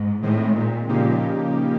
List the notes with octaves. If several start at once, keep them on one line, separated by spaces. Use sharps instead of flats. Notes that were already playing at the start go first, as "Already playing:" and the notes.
Already playing: G#2
A2 D#3 G#3 C4
A#2
A#2 C#3 F3 A#3 D#4 G4